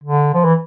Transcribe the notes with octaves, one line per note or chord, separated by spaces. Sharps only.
D3
F3
E3